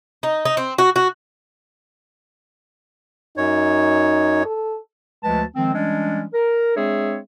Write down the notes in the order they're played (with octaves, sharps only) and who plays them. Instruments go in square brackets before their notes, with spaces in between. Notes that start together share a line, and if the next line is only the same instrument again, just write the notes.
[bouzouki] D#4
D#4
C4
F#4
F#4
[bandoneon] F#2 C#5 [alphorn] D#4
[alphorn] A4
[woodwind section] D2 F3 G#3 B4 A5
D#3 F3 G#3 C4
E3 G3 G#3 C#4 D4
A#4
G#3 C4 D4 G#4 C#5 E5